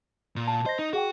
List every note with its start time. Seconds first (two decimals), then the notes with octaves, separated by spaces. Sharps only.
0.36 A#2
0.48 A5
0.66 C5 D#5 A#6
0.79 D#4
0.93 F#4 G#4 F#5 G5